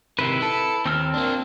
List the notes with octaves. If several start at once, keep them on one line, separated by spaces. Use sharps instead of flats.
C3 D#3 E4 B4
A4
D#2 C4 E6 F6
A#3 D4